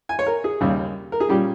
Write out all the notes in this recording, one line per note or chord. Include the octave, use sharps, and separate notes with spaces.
G#5
C#5
A#4
G#4
D#2 C#3 G3 C#4
A#4
G#4
A#2 G3 C#4 G4